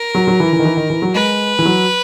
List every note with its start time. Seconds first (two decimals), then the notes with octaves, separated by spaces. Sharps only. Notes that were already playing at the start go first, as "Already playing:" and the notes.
Already playing: A#4
0.15 F#3
0.28 F#3
0.40 E3
0.53 E3
0.59 D#3
0.65 E3
0.77 D#3
0.90 E3
1.02 F#3
1.14 G#3 B4
1.59 E3
1.65 F#3